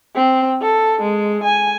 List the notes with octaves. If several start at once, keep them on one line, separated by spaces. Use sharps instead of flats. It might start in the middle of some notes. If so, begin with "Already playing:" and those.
C4
A4
G#3
G#5